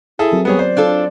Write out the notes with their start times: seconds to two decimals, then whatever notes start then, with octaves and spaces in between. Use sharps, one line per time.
0.19 E4 G#4 A4 E5
0.32 F#3 C4 A#4
0.45 G3 B3 G#4 C#5
0.59 C5 D5
0.77 D4 F4 A4